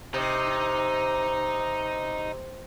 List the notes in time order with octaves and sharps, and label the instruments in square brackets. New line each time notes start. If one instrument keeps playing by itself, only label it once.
[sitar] C3 [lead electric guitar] D#4 D#5